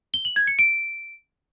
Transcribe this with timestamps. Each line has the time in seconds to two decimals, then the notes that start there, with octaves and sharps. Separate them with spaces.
0.14 G7
0.25 F#7
0.36 G#6
0.47 C#7
0.59 D7